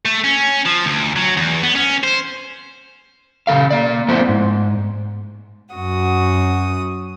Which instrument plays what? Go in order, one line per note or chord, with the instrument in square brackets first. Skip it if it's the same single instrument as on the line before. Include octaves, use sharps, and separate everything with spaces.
[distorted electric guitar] A3
C#4
F3
D2
F#3
E2
B3
C#4
C5
[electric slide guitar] C#3 F3 A4 F5
A#3 D5
F3 A3 B3 C4 E4 C5
G#2
[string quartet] F#2 F#4 D#6